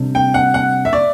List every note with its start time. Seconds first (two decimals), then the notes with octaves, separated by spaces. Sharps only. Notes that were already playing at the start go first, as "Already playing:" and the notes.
Already playing: C2 C3 G3 D4
0.15 G5
0.34 F#5
0.54 F#5
0.85 E5
0.93 D5